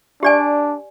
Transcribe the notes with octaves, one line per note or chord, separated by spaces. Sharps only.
D4 G4 D5 G#5